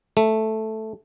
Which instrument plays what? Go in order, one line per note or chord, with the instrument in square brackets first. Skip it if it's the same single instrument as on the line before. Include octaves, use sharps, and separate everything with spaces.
[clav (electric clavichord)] A3